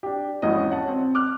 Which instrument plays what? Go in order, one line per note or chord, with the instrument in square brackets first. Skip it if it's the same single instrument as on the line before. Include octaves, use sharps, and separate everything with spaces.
[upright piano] D4 G4
G#1 E2 E3 C#4 D#5 D#6
C#5 F#5 A5
C4
D6 F6 F#6